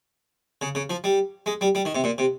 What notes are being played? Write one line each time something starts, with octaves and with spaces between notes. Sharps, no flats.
C#3
C#3
F3
G3
G#3
G3
G3
D#3
C3
A#2
C3